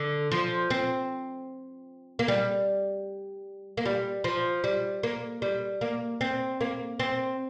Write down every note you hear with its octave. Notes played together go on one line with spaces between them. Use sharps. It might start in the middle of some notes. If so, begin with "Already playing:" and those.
Already playing: D3
F3
C4
A#3
G3
A#3
G3
F3
G3
A#3
G3
A#3
C4
A#3
C4